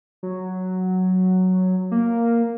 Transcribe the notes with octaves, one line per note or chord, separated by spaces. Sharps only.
F#3
A#3